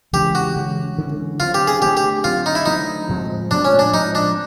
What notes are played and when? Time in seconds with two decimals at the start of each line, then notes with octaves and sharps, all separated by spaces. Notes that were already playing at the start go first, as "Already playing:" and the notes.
0.13 C#3 E3 G#3 C#4 G4
0.35 F#4
0.56 C#3 E3 G#3 C#4
0.98 C#3 E3 G#3 C#4
1.40 D3 F#3 A3 C4 F4
1.54 G4
1.67 G#4
1.82 D3 F#3 A3 C4 G4
1.97 G4
2.24 D3 F#3 A3 C4 F4
2.46 D#4
2.55 E4
2.66 D3 F#3 A3 C4 D#4
3.09 A2 F3 G#3 C4
3.51 A2 F3 G#3 C4 D4
3.65 C#4
3.79 D4
3.93 A2 F3 G#3 C4 D#4
4.15 D4